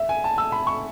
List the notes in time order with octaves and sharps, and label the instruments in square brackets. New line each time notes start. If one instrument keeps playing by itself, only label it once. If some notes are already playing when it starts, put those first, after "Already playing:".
Already playing: [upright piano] E5
G#5
A5
E6
B5
C#6